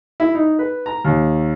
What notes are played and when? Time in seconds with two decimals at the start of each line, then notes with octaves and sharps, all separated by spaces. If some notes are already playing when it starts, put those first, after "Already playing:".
0.20 E4
0.35 D#4
0.59 B4
0.86 A#5
1.05 D#2